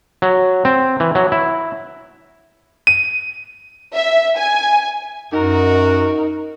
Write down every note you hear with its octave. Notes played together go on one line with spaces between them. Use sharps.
F#3
C4
E3
F#3
E4
D#7
E5
G#5
F#2 D#4 F#4 A#4